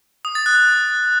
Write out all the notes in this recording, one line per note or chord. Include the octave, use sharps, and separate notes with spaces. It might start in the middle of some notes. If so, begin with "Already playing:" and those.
D#6
A6
F#6